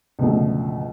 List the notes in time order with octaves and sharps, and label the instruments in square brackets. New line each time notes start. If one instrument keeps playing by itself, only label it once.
[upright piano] C#2 F#2 B2 D3 F3 A3